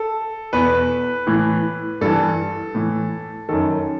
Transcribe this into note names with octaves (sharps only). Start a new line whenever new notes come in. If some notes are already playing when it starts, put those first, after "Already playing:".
Already playing: A4
E2 B2 B4
A2 E3
G2 E3 A4
A2 E3
F#2 D#3 A4